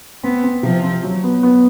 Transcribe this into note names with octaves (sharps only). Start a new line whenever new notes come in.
B3 C4
C4
C3 F3
C4
F#3
B3
B3